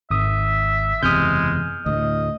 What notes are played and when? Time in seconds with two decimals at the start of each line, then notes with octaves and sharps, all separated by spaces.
0.11 G#1 E5 D#6
1.03 F#1 E2 C3 G#3 D#6 F6 G6
1.86 D2 A2 D#5